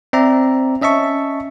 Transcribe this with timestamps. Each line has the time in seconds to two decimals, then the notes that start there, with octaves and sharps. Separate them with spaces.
0.13 C4 D5 E5 A#5
0.82 C#4 D#5 E5 A5 C#6